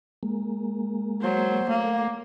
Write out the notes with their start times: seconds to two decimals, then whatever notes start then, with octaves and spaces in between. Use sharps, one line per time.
0.23 G#3 A#3
1.21 F#3 C5
1.69 A3 A#3